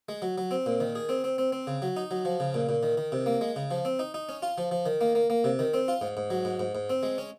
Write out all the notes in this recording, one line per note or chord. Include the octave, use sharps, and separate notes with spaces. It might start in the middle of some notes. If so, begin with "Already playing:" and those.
G#3
F#3
F#3
C4
A#2
D#3
G#4
C4
C4
C4
C4
C#3
F#3
D#4
F#3
F3
C#3
A#2
A#2
D#3
D#3
C3
A#3
G#3
C#3
F3
C4
D#4
D#4
C#4
F4
F3
F3
D#3
A#3
A#3
A#3
C3
D#3
C4
F4
G#2
G#2
F#3
G#2
G#2
G#2
C4
G#3
C#4